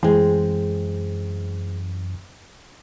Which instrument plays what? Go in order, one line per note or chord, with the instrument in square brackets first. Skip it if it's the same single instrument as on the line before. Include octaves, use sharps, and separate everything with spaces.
[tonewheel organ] F#2 [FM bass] E3 [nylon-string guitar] G#3 C4